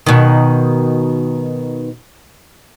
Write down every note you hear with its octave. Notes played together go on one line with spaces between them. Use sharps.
B2 D#3